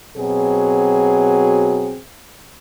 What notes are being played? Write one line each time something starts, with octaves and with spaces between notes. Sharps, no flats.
B2 F#3 C4 G#4